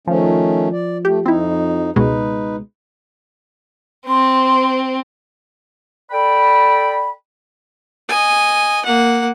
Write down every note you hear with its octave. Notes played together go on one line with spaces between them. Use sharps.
D#3 F3 A3 C#4
D5
A3 G4
F2 C4 D#4 E4
C#2 B2 G#3 D#4 B4
C4 C6
A4 D5 G5 B5
D#5 G#5
A#3 F#5